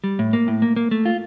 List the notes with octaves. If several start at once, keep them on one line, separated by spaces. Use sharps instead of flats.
G3
A2
A#3
A2
A#3
A#3
A3
F4